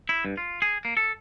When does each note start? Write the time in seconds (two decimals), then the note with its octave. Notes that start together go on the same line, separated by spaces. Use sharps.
0.09 E4
0.25 G2
0.37 F4
0.62 G#4
0.85 A#3
0.97 A4